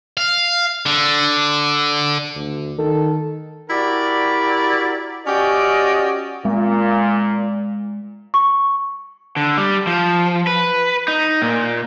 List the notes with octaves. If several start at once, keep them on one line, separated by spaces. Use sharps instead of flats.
F5
D3
D2
D#3 A4
E4 F#4 G4 A#4 D5
C#4 F#4 G4 D5 D#5
A#2 G#3
C#6
D3
G3
F3
B4
D#4
A#2